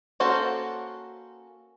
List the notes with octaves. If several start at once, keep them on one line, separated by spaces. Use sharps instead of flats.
A#3 C#4 F#4 A4 C5